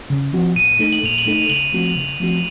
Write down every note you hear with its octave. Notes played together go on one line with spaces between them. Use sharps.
C#3
F3 C4 F#4
A#2 D#7
A3 D#4 A4
F#7
A#2 F7
F#7
A3 D#4 A4
C#3 F#7
F3 A3 C4 F#4
C#3
F3 A3 C4 F#4